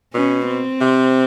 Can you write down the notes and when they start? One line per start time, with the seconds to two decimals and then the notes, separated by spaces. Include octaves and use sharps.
0.14 B2 C#4
0.47 C4
0.80 C3